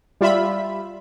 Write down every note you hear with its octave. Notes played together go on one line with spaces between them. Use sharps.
G3 F4 E5 B5